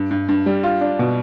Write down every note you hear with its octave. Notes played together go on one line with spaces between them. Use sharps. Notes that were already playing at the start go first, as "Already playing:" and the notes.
Already playing: G2
G2
G2
G3
F4
D4
B2